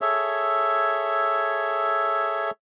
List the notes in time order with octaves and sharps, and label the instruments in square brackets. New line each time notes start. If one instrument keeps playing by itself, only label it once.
[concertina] G#4 A4 C#5 E5